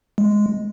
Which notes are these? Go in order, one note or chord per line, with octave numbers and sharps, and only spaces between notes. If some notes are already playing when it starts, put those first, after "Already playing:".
G#3